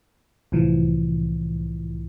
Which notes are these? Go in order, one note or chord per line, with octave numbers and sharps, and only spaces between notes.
C2 A2 E3 F3